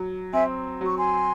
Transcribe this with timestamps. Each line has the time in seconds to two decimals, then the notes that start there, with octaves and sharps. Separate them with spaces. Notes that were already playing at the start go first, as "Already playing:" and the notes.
Already playing: F#3
0.33 C4 E5 G#5
0.81 F#3 C#6
0.96 G#5 C6